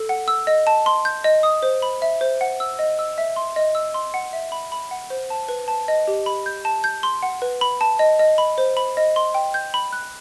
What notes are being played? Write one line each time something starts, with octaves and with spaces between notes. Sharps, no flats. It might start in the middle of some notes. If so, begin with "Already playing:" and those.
Already playing: A4
F#5
E6
D#5
A5
C6
G6
D#5
D#6
C5
B5
E5
C5
F#5
E6
D#5
E6
E5
C6
D#5
E6
C6
F#5
E5
B5
B5
F#5
C5
A5
B4
A5
D#5
G4
B5
G6
A5
G6
C6
F#5
B4
B5
A5
D#5
D#5
B5
C5
B5
D#5
C6
G5
G6
B5
F#6